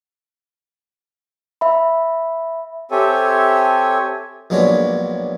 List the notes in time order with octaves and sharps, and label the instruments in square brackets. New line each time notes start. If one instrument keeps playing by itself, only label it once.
[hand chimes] E5 B5
[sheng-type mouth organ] C4 G4 A4 C#5 E5 G#5
[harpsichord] A#1 F#3 G#3 B3 D4 C#5